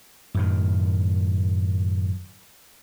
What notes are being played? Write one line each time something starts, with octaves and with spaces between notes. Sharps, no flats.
F#2 A2 D#3